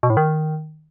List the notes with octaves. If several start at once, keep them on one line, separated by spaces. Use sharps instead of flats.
B2
A2
D#3